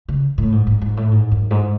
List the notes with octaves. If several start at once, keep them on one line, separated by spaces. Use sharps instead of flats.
C#3
A2
G#2
G#2
G#2
A2
G#2
F#2
G#2